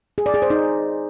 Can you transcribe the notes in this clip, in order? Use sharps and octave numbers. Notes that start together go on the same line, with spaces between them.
G#4
D5
G#4
C5
D#4